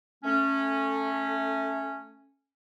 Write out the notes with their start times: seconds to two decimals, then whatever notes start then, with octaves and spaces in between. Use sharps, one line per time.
0.24 A3 C#4